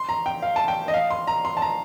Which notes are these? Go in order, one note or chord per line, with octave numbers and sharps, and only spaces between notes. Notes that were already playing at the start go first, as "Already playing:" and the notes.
Already playing: C6
A#5
G5
F5
A5
G5
D#5
F5
C6
A#5
C6
A5
A#5